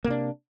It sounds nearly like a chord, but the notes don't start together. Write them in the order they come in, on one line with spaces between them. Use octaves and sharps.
A#3 C3 D4